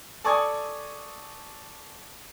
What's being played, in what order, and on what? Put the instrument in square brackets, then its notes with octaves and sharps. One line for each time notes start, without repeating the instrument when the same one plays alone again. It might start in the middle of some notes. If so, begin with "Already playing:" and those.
[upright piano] A4 D5 G#5 C#6 D#6 G#6